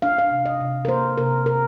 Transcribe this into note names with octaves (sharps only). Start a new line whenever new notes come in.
D4 F5
F5
C3
D#5
C3
A#4
A#3 C5
C3 A#4
C3 A#4